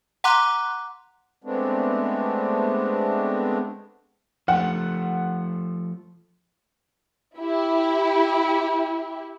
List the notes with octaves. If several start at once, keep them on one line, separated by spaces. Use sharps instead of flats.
F#5 A#5 C6 D6 F#6
G#3 A3 B3 C4 D4
F3 A3 F#5
E4 G4